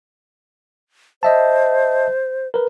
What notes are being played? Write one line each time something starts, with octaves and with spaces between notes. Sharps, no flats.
C5 D#5 E5 A5
A#4 B4